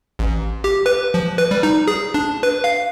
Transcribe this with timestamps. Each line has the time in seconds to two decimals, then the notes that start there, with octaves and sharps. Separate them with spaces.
0.19 A1
0.64 G4
0.86 B4
1.14 F3
1.38 B4
1.51 G3
1.63 D#4
1.87 G#4
2.14 D4
2.43 B4
2.64 F5